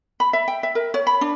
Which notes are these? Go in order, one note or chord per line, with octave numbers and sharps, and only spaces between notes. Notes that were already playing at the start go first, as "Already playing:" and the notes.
B5
E5
G5
E5
A#4
C#5
B5
D4